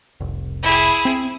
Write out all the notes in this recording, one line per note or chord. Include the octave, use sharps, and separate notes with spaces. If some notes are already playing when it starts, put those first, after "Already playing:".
F1 C2
E4 G#4
C4